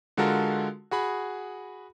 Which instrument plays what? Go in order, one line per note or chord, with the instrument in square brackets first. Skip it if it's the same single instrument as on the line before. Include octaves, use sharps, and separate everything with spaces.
[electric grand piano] D3 G#3 F4 F#4 A4 A#4
F#4 G#4 B5